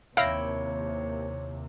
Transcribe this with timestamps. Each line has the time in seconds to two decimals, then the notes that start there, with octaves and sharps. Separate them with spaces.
0.17 D#2 C3 E4 C#5 F5 G5 A#6